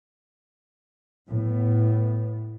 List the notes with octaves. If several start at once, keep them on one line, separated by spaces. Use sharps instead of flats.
A2 B3